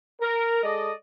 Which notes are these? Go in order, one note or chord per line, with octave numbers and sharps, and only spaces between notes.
A#4
G#3 A4 D5 D#5